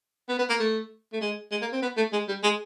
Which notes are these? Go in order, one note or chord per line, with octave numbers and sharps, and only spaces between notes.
B3
B3
A#3
A3
A3
G#3
G#3
A#3
C4
B3
A3
G#3
G3
G#3